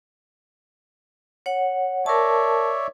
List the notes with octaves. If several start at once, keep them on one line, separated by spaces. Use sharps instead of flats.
C#5 F#5
A#4 C#5 D5 E5 A5